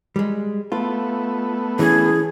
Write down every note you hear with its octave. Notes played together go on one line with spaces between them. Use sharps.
G3 G#3
A3 B3 F4
E3 C#4 G#4